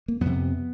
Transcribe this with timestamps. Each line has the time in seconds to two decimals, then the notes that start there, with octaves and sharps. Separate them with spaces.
0.08 A#3
0.21 F2 C3 B3